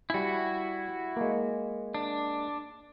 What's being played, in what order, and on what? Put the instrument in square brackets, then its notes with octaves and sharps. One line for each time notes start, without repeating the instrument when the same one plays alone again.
[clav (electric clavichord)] G3 G#5 [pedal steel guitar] E4 F#4
[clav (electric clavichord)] G#3 A#3
[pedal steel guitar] D4